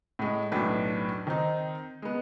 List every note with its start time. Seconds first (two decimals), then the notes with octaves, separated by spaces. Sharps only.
0.19 A2 G#3
0.52 B1 F#2 A2 A3 D4 B4
1.27 D#3 C4 D#4
2.02 G#3 B3